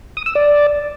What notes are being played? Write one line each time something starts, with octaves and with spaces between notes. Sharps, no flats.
D#6
E6
D5